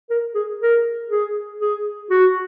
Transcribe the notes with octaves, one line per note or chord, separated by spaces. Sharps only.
A#4
G#4
A#4
G#4
G#4
F#4